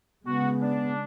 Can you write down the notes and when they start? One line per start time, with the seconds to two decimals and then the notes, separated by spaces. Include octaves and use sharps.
0.25 C#3 G#3 B3 F#4
0.60 D4